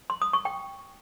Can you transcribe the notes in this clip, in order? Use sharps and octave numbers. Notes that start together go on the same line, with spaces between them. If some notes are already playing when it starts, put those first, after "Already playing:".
C6
D#6
C#6
G5